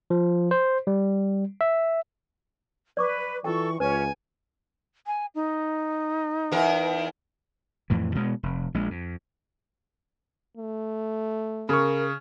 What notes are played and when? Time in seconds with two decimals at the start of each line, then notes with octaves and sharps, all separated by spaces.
0.10 F3
0.51 C5
0.87 G3
1.61 E5
2.97 B4 D5 C#6 D6
3.44 E3 F4 A4 G5 C#6
3.80 C#2 C#4 B4 G#5
5.06 G#5
5.35 D#4
6.52 E2 A#4
7.90 F2 A2 E3
8.15 B2 G#3 B3
8.43 F1
8.74 A#1 G#3
8.90 F2
10.57 A3
11.69 C#3 A#4 C#6